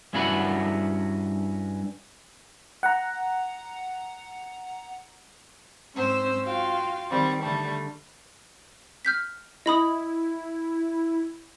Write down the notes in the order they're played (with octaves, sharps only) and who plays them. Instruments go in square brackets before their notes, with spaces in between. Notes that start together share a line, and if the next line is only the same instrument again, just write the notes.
[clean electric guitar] G2 C#4 E4 F#4 F#5 B5
[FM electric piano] F#5 A#5
[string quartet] G#2 C4 C#4 C5 E6
F4 F#4 F5 G5
D#3 G3 C4
D3 G3 A3
[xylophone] F6 G6 B6
[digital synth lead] E4 [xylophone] D#5 B5 D#6